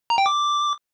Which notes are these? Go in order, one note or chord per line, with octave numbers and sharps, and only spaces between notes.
A#5
G5
D6